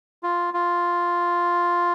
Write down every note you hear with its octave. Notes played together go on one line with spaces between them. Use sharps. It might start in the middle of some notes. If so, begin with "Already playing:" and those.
F4
F4